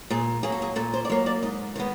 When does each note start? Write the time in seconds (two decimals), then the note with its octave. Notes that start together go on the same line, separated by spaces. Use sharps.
0.10 A#2 G#4
0.43 F#3 A#3 G#4
0.52 A4
0.62 G#4
0.76 A#2 A4
0.94 C5
1.05 D5
1.09 F#3 A#3 C#5
1.26 D5
1.43 G#2 D#5
1.76 D#3 G#3 B3